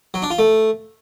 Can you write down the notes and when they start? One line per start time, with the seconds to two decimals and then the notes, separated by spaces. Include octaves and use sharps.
0.14 F#3
0.22 D4
0.30 F4
0.39 A3